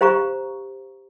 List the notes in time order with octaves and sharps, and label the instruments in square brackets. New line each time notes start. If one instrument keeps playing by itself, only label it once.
[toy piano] G4 C5 F5 A#5 C#6